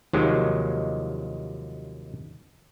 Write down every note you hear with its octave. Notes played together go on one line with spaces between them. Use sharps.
D#2 C3 D#3 F3 F#3 G#3